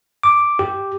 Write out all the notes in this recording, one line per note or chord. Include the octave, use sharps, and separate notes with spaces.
D6
G4